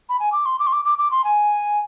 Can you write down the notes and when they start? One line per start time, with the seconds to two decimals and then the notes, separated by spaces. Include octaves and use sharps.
0.09 B5
0.20 G#5
0.32 D6
0.46 C6
0.59 D6
0.67 C6
0.73 D6
0.85 D6
0.98 D6
1.11 C6
1.24 G#5